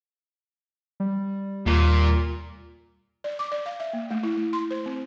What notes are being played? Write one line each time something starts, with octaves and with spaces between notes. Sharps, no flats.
G3
D#2 A#2
D5
D6
D5
F5
E5
A#3
A3
E4
A3
C6
C5
C4